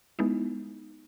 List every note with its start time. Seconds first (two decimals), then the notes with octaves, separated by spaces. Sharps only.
0.19 G#3 B3 D#4 E4